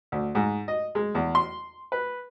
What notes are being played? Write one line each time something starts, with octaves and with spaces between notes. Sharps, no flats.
D2
G#2
D#5
G#3
E2
C6
B4